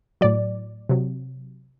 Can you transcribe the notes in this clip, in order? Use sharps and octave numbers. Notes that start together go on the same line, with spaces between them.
A2 F#3 D5
C3 F#3